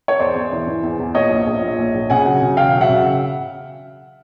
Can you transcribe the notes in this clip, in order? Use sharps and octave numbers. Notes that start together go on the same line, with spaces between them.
C#5
E2 C5 D5
E2
E3
E3
E2
E2
A#2 C#5 D#5
A#1
A#1
A#2
A#1
A#1
C#3 F#5 G#5
F#3
C#3
E1 F5 G5
F#3
E5 F#5
C#3